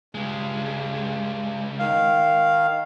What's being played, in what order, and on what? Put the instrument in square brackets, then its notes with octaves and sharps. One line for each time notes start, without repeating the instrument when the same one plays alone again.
[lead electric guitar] C#2 G#3 [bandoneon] G2
[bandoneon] D#3 F5